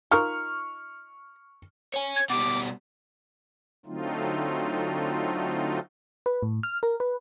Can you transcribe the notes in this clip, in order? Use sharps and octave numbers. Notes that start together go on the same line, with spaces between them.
D#4 F4 A#4 C#6 F6
C#5 G#5
G#6
B2 G3 D6
D3 F#3 A3 C4 D#4 F4
B4
A2
F6
A#4
B4